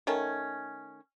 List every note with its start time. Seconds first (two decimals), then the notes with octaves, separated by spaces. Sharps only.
0.07 D#3 A3 C#4